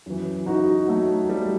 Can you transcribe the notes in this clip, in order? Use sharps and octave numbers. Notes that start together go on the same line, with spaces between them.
F#2 E3
D#4 F#4
F#3 A3
G3